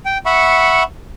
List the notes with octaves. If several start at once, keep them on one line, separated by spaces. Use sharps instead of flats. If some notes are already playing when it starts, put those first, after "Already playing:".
G5
E5 F#5 B5 C#6